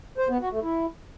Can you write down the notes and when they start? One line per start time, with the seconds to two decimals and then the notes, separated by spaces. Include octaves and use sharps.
0.18 C5
0.29 B3
0.40 F#4
0.52 A3
0.63 E4